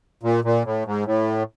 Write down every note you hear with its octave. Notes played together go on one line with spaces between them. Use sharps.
A#2
A#2
A2
G#2
A2